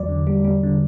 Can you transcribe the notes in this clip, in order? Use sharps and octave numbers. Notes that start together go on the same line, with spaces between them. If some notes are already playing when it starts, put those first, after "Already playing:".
Already playing: E2 F#3 D5
D3
G3
G3
D3